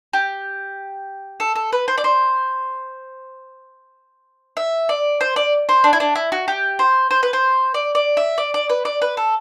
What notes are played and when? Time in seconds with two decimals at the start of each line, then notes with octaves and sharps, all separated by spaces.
0.13 G4
1.40 A4
1.56 A4
1.73 B4
1.88 C5
1.98 D5
2.04 C5
4.57 E5
4.89 D5
5.21 C5
5.36 D5
5.69 C5
5.84 D4
5.93 E4
6.00 D4
6.15 E4
6.32 F#4
6.48 G4
6.79 C5
7.11 C5
7.23 B4
7.33 C5
7.74 D5
7.95 D5
8.17 E5
8.38 D5
8.54 D5
8.69 B4
8.85 D5
9.02 B4
9.17 A4